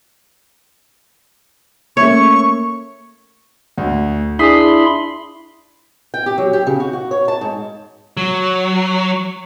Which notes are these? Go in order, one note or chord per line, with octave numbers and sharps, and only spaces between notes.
A3 A#3 C#4 C#5 E5 C#6
D2
D4 E4 G#4 B5 C6 D#6
G5
G4
F#3
G4
C#3
F#4
F#4
C#5
A5
G#2
F#3